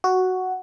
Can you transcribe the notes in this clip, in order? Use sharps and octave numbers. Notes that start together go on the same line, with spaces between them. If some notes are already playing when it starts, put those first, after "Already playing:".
F#4